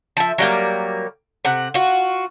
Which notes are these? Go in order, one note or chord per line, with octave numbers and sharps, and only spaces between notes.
F3 E5
F#3 G3 A#3
C3 F#5
F4 F#4